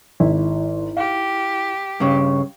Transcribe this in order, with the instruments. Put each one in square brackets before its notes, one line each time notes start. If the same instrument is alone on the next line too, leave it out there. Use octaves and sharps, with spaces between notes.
[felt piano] G#1 [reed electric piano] E4
[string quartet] G4 [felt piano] F5
[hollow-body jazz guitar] G2 C#3